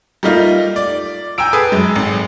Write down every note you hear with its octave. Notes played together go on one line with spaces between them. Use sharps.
G3 A3 A#3 D#4 F4
D5
G5 G#5 A#5 E6 D7
G#4 A4 B4 D#6
F#2 G#3
G#1